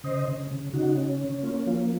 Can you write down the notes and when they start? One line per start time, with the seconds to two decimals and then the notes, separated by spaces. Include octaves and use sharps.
0.04 C#3 C5 D#5
0.28 C#3
0.51 C#3
0.73 C#3 D#4 F#4
0.97 C#4
1.20 C#4
1.43 A#3 F4
1.66 F3 F4